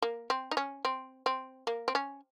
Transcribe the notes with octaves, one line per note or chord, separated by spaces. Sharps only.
A#3
C4
D#4
C#4
C4
C4
A#3
C4
C#4